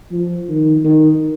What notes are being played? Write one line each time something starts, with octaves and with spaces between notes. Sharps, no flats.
F3
D#3
D#3